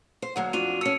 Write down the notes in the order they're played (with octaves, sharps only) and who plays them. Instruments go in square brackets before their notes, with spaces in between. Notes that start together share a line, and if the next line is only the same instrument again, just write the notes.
[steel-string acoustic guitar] C5
[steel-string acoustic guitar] D2 F#3 A#3 [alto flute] F#5
[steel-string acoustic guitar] F2 D4 F4 [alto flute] F#4 [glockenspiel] D#7 F7
[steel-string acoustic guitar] C#4 A4 [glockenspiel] E6 C#7